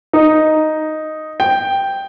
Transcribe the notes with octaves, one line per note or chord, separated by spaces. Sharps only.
D#4
G5